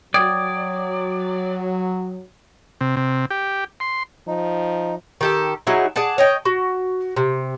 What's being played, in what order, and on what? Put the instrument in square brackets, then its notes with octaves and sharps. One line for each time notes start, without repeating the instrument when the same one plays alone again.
[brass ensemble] F#3 [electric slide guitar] D5 [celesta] G5 D#6 G#6
[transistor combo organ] C3
C3
G4
C6
[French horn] F3 [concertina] D#4
[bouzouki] D#3 G4 A4
F#3 D#4 E4 G#4
G#4 D5 F#5 A5
C#5 D#5 G5
F#4
C3